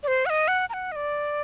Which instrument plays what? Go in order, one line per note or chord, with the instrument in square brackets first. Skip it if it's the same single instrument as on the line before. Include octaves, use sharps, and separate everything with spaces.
[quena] D5
C5
F#5
D#5
F#5
A#5
F#5
D#5
D5